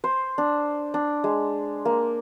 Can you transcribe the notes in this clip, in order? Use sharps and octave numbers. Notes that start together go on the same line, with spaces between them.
C5
D4
D4
G#3
A#3